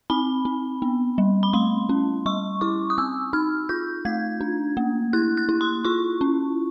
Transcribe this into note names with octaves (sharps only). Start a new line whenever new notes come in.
C4 B5
C4
B3
G3
B5
A3 C6
C#4
G3 C#6
E4 D6
D#6
C4 E6
D#4 F6
F4 G6
A3 G#6
D4
A#3
E4 F#6
F#6
E4
C6
F4 C#6
C#4